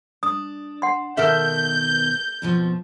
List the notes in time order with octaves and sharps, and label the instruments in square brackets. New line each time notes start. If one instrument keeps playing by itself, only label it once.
[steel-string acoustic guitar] D4 [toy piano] D#6
[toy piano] F#5 C6
[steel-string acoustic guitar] B2 D#3 [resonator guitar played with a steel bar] A4 A#4 E5 [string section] G6
[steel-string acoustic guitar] F2 B2 F3